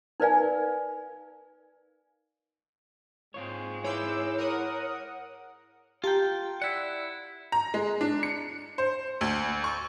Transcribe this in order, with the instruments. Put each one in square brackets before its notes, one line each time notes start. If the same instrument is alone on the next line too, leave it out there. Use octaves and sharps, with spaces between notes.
[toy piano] D#4 A#4 B4 D5 F5 G#5
[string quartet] G#2 G#3 [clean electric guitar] C4 F4 C#5
[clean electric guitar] E4 G#4 B4 [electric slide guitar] C#5 [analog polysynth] D6 E6 G6
[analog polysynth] A#4 F#5 D#6
[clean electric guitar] F4 G5 [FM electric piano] G4 A5 A#5
[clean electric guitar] E4 F#5 [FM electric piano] D5 E6
[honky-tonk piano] A#5
G#3
D4
C#7
C5
D2
C#6